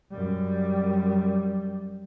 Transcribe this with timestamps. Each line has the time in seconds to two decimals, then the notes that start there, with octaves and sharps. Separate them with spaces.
0.11 F#2 G3